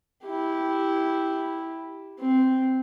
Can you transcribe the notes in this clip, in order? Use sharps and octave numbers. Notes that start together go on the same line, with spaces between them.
E4 G4
C4